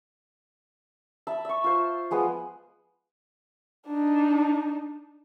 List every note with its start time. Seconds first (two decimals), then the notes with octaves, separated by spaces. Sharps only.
1.27 E5 A5 B5
1.45 E5 C#6
1.64 F4 C5
2.11 F3 G#3 B3
3.87 D4 D#4